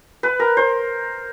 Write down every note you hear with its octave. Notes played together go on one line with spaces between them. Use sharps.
B4
A#4
C5